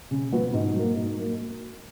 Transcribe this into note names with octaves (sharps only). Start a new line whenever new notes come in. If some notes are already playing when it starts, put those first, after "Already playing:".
C#3
F3 B3 F#4
G#2
F#3 A#3
G#2
F#3 A#3